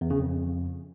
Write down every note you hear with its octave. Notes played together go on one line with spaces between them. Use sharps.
E2
C#3
F2